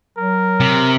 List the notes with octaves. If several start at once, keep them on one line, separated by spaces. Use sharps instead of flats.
F#3 A#4
C3